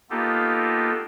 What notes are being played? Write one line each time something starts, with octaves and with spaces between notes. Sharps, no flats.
A#3 B3 D#4 F4 G4 A4